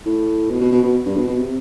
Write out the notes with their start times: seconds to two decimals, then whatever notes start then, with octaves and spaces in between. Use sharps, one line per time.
0.05 A2
0.50 B2
0.60 B2
0.72 B2
0.83 B2
1.06 G2
1.17 B2
1.27 B2
1.38 C3